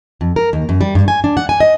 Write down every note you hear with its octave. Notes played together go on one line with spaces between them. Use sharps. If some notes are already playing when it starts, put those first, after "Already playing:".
F2
A#4
D#2
F#2
G3
G2
G#5
D4
F#5
G#5
D#5